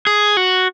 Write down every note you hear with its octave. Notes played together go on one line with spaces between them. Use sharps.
G#4
F#4